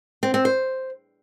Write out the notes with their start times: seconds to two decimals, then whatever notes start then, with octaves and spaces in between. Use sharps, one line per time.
0.23 C4
0.34 C4
0.45 C5